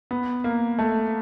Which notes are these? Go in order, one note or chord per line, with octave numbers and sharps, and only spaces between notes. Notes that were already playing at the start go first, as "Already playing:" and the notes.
B3
A#3
A3